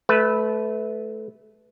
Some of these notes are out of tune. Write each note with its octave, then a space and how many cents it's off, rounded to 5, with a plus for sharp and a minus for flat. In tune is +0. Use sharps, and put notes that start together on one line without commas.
A3 -20 B4 +5